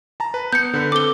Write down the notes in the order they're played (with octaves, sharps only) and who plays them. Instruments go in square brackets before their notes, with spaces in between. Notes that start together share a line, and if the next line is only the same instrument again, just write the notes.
[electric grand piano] A5 A#5
B4
[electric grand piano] B3 [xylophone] G6 C#7
[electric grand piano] D3 B4
[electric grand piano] C4 A4 [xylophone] D6 G7